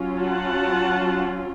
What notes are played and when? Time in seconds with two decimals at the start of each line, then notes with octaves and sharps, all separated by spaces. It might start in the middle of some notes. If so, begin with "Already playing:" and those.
Already playing: F#3 C#4 F4
0.21 F#5 A5